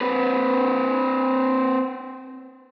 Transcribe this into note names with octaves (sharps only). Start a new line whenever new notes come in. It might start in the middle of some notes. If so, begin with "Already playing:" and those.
C4 B4